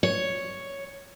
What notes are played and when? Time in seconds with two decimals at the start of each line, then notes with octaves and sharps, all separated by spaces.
0.03 C#5